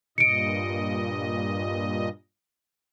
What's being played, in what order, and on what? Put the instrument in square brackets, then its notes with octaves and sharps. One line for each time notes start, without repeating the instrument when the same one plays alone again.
[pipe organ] G2 A#2 D#5 [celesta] C#7 D7